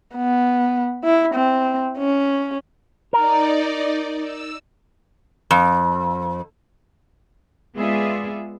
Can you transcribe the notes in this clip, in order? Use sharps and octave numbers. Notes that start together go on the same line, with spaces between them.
B3
E4
C4
C#4
D#4 A#4 D5
E6
F2
G#3 B3 F4 G#4 D5 E5